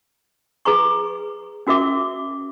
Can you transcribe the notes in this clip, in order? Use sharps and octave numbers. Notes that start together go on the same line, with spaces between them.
G#4 B4 A#5 C#6
C#4 F#4 A#4 E5 D6